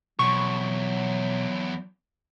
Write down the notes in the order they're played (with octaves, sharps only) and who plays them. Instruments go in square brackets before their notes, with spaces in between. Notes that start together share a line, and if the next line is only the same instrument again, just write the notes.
[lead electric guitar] E2 F3 [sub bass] B2 [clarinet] F#3 [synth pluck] C#6